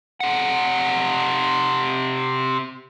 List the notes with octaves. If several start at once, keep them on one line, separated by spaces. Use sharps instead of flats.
C3 F#5